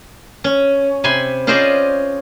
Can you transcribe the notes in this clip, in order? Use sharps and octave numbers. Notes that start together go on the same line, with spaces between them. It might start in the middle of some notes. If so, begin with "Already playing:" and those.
C#4
C3 G#5 B5 C6
C#4 F4 G#4 C5 D5 D#5